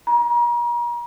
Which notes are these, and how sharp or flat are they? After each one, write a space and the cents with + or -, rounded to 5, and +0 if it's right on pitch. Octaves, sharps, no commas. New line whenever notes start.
A#5 +40